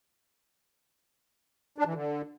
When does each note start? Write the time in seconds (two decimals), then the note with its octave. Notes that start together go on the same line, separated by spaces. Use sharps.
1.78 D4
1.86 E3
1.94 D3